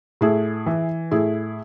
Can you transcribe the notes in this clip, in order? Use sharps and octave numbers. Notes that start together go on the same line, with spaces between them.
A2 E4 G#4
E3
A2 E4 G#4